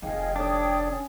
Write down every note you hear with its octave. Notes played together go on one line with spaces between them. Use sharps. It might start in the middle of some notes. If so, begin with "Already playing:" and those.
F1 D#3 G#4 D#5 F5 G5
D4 A4 C#5 D#6
C#4